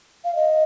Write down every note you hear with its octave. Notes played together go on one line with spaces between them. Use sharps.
F5
D#5